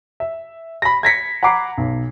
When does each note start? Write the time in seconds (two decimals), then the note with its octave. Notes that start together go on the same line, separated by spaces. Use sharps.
0.20 E5
0.82 B5 A#6
1.03 G#6 A#6 B6 C#7
1.43 F#5 A#5 B5 D6 C7
1.78 B1